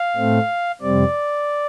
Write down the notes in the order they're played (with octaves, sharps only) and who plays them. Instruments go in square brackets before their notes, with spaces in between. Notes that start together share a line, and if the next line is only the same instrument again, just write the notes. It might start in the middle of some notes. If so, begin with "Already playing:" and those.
Already playing: [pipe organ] F5
A2 A3 C4
F2 C3 G3 C4 D5